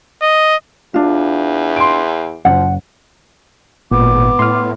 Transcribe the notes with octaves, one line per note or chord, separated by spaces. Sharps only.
D#5
E2 D4 F4
C6 D7
F#1 F3 F#5
G#1 A#2 B3 D6
A2 C6 F6